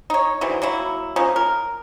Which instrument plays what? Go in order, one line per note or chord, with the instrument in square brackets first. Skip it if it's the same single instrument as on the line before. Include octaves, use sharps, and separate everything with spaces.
[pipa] D#4 C#5
D3 E3 F#3 C4
F#3 A#3 E4
F3 A#3 C#4 D#4
A#4